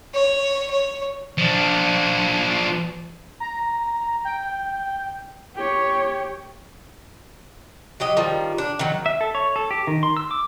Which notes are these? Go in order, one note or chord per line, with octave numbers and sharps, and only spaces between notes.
C#5
C#5
F3 D4
A#5
G5
G4 C#5
F#3 G4 D#5
D#3 F3 G3
D4
D#3 F#3
E5
A4
C#5
A4
G4
D#3
C6
E6
D6